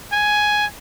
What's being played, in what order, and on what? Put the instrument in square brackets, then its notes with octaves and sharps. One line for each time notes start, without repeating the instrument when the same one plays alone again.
[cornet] G#5